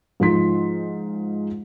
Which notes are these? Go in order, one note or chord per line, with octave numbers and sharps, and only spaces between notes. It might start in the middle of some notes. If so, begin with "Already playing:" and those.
G#2 F3 D#4 C6 B6